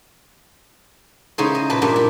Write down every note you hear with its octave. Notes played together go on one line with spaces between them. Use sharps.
C#3 G#3 D#4 E4 C5
D#5
A#2 B4 A5
G2 A#2 D4 G4
E4